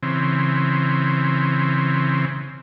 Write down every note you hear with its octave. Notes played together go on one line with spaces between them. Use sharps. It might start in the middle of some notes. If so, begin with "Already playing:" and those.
C#3 E3 C4